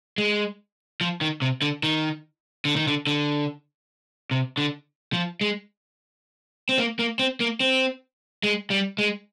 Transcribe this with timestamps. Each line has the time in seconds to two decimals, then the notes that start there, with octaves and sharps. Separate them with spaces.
0.18 G#3
1.01 F3
1.21 D#3
1.42 C3
1.62 D3
1.83 D#3
2.65 D3
2.76 D#3
2.87 D3
3.07 D3
4.31 C3
4.58 D3
5.13 F3
5.41 G#3
6.69 C4
6.79 A#3
6.99 A#3
7.19 C4
7.40 A#3
7.60 C4
8.43 G#3
8.70 G3
8.98 G#3